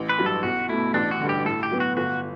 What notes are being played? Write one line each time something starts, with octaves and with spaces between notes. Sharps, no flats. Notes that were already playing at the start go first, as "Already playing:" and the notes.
Already playing: A1
B4
G2 F#3
A4
B1 F#4
B2 A3 E4
A1 D4
F#4
G2 D3
G4
A2 A4
G4
F#3 B3
F#4
G1 F#4